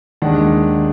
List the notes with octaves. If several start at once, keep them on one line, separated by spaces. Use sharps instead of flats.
D#2 D#3 G#3 D4 F#5